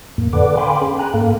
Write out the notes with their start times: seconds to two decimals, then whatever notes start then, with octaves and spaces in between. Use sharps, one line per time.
0.18 F2 A2 A#3
0.33 D3 A4 B4 D5 F#5 D6
0.57 F5 G5 G#5 B5 C6 D6
0.81 C#4 G#4
0.99 G5 G#5 A#5 F#6
1.14 G#2 A#3 A4 F5